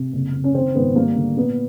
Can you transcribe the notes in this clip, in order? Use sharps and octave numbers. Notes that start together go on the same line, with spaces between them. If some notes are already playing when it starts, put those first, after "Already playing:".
Already playing: C3
F#1
F#1
C#4
D#3 C4
G#1 B3
G3 A#3
D3
A#2 B3